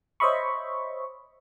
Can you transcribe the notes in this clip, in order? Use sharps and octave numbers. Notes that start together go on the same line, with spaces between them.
C5 C#5 D#5 E5 B5 C#6